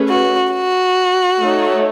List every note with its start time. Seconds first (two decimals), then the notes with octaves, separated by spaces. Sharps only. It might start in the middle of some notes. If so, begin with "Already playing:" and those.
Already playing: A3 C#4 G#4 B4
0.09 F#4
0.53 F#4
1.40 A3 D#4 A4 C#5